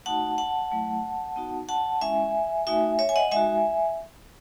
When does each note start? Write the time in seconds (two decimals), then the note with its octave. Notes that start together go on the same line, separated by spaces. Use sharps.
0.06 A3 D#4 F#4 F#5 A5
0.38 F#5 A5
0.72 F#3 A3 E4
1.36 B3 D#4 F#4
1.69 F#5 A5
2.01 G#3 C#4 E4 E5 G#5
2.67 A3 D#4 F#4 E5 G#5
2.99 C#5 E5
3.09 G#5
3.16 D#5 F#5
3.31 G#3 D#4 F#4 E5 G#5